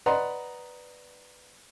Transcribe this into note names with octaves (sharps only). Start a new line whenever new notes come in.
B4 D5 D#5 F#5 A#5 C6